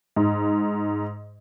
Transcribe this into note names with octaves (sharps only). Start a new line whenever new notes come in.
G#2